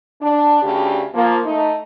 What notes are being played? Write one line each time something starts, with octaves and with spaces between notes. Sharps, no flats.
D4
D2 C#3 D4 G4
F3 A#3
A3 D#4